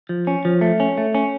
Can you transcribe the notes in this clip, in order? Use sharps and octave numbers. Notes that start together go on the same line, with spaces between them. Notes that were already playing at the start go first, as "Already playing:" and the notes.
F3
C#4
F3
A3
C#4
A3
C#4